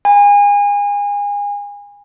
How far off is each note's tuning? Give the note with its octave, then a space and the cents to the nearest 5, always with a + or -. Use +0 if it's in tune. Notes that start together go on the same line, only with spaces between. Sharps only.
G#5 -30 B5 +0